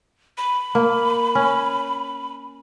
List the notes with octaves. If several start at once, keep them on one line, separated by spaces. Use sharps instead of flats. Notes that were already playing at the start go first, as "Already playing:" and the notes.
B5
A#3
C#4